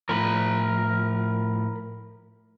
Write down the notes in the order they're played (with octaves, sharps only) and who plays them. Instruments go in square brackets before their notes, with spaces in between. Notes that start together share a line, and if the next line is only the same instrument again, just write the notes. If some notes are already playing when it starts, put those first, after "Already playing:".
[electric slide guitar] A2 F3 [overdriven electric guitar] A#4 B5